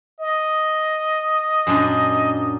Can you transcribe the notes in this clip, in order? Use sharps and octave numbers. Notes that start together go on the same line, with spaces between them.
D#5
F#2 A#2 D4